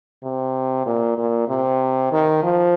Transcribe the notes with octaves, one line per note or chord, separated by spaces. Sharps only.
C3
A#2
A#2
C3
D#3
F3